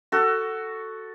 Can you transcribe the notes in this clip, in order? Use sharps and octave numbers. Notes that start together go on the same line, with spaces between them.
F#4 A4